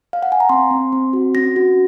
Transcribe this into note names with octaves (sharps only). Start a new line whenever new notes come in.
F5
F#5
G#5
A#5
C4 C6
C4
C4
F#4
C#4 A#6
F#4